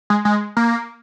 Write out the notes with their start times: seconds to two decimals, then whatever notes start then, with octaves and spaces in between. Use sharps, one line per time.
0.10 G#3
0.25 G#3
0.57 A#3